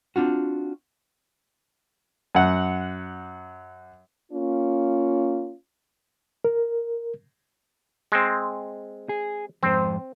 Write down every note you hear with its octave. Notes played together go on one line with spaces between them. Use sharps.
C4 D4 F4 F#4
F#2 F#5
A#3 C#4 F4
A#4
G#3 C4
G#4
F2 G#2 C4 C5